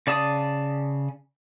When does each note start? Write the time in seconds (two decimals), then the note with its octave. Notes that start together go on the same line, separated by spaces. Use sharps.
0.07 C#3 D5 A5 D#6